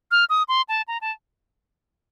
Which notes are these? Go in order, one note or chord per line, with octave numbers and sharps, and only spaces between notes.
F6
D#6
C6
A5
A#5
A5